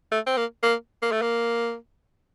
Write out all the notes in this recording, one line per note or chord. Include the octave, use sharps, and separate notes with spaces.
A3
C4
A#3
A#3
A#3
A3
A#3